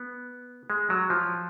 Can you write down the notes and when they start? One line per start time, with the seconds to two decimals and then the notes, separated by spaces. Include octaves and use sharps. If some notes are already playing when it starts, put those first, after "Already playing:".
Already playing: B3
0.70 G#3
0.90 F#3
1.10 F3